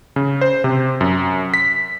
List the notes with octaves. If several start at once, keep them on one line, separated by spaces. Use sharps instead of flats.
C#3
C5
C3
F#2
B6